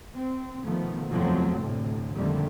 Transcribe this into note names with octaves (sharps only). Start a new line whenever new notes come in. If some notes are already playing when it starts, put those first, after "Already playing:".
C4
B2 D#3 F3 A3 B3
F#1 E2 F3 F#3 A3 C4
D2 A2 C3
A#1 F2 D3 D#3 G3 A3